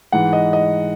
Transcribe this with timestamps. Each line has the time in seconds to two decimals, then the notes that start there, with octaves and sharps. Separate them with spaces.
0.12 G#2 E3 F#5
0.33 D#5
0.53 D#5